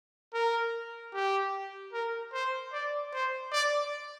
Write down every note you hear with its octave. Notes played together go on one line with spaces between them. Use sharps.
A#4
G4
A#4
C5
D5
C5
D5